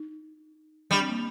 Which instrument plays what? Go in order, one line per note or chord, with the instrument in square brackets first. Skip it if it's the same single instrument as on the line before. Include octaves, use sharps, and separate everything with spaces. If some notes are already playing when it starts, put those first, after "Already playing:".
Already playing: [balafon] D#4
[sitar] G3 [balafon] D4
[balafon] C4
A#3